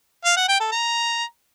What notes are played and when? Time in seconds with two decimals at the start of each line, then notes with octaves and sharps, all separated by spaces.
0.25 F5
0.37 F#5
0.48 G5
0.60 A4
0.72 A#5